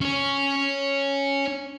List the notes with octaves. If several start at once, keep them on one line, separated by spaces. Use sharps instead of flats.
C#4 C#5